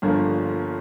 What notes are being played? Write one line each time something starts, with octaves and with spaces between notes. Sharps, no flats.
G1 G2 D3 F3 A#3